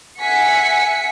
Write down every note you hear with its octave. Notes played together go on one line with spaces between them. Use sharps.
E5 F#5 G#5 B6 C#7